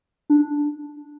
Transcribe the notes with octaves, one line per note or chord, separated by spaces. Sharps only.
D4